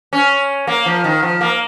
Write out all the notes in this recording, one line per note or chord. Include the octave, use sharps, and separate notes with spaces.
C#4
A#3
F3
D#3
F3
A#3